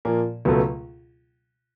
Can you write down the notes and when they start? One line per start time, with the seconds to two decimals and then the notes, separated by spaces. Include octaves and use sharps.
0.05 A#2 F3 A#3
0.45 C#2 B2 F#3 A3